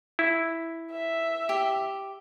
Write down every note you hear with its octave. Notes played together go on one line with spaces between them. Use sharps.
E4
E5
G4